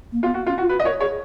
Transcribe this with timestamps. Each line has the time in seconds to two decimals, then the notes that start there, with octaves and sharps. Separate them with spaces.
0.12 A#3
0.23 B3 F4
0.34 F#4
0.46 C#4 F4
0.58 F4 F#4
0.69 F#4 B4
0.80 D#5
0.85 A#4 C#5
1.00 G#4 C#5